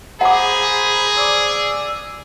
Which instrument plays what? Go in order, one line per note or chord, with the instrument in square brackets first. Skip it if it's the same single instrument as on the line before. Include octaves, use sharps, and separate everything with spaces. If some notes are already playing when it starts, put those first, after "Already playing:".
[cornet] G#4 [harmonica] C5 A#5 B5 [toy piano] F#5 D6
[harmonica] D5 E6